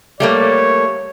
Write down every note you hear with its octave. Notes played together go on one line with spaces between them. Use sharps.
G3 A3 A#3 C#5